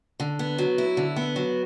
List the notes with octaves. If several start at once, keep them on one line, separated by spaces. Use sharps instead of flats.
D3
B3
F#3
E4
D3
B3
F#3